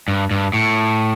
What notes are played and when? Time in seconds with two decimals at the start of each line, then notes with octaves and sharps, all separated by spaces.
0.08 G2
0.31 G2
0.54 A2